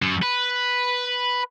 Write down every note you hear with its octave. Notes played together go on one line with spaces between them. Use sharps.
F#2
B4